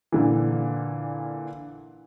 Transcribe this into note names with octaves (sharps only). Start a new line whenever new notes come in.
A#2 D3 E3